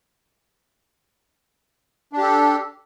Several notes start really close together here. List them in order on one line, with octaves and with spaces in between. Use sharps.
D4 G4 A4